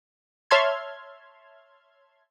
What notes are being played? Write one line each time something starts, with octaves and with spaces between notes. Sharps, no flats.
C#5 E5 A5 C6 F6 G#6